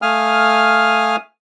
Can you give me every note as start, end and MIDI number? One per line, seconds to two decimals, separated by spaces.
0.02 1.16 57
0.02 1.16 77
0.02 1.16 80
0.02 1.16 87
0.02 1.16 89